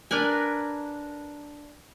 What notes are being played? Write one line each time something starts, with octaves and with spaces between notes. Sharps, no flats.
D4 A#4 B4 G#5